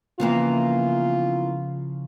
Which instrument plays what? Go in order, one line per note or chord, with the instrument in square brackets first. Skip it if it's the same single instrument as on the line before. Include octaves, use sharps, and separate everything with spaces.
[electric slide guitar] C#3 F3 [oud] E3 A#3 B3 [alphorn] F4